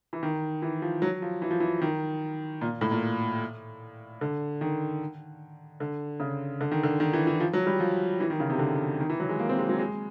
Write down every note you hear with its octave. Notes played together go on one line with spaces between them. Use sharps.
E3
D#3
E3
F3
F#3
F3
E3
F3
E3
D#3
A#2
A2
A#2
D3
D#3
D3
C#3
D3
D#3
D3
D#3
E3
E3
F3
F#3
G3
F3
E3
D#3
C#3
C3
D3
D#3
E3
F#3
G#3
A#3
C4
G#3
F#3
G#3